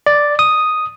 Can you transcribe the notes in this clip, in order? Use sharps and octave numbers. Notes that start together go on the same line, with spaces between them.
D5
D#6